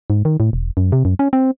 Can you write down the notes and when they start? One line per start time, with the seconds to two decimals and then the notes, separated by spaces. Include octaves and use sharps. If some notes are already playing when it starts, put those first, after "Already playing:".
0.10 G#2
0.25 D#3
0.40 A2
0.53 E1
0.77 F#2
0.92 C3
1.05 F#2
1.19 C#4
1.33 C4